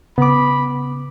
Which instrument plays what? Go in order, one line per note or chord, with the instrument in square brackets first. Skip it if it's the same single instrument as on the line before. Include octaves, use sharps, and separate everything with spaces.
[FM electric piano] C#3 [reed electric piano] B3 D6 [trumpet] B5